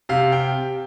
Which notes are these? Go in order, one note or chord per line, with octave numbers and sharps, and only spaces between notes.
C3 F5
G5